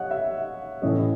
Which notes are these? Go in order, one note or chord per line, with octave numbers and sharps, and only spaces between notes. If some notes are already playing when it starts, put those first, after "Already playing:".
Already playing: C#5 D#5 F5 F#5
E5
A2 E3 A3 C#4 D#5